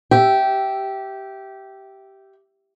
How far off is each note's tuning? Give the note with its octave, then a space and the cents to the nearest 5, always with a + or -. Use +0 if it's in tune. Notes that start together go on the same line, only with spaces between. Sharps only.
G4 -15 E5 +0